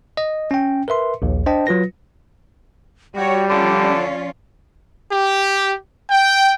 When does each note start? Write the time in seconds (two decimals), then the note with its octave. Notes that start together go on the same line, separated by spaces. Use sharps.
0.17 D#5
0.51 C#4 G5
0.88 A#4 B4 E5 C6
1.22 A#1 D#2
1.46 D4 C5 D#5 G5 A5
1.67 F#3 F4 B4 A#6
3.15 G3 F#4 C#5 G5
3.50 D3 F3 C#4 F4 D5
5.12 G4
6.10 G5